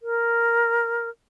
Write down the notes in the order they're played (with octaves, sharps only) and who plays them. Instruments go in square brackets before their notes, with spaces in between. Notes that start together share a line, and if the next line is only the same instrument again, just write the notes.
[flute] A#4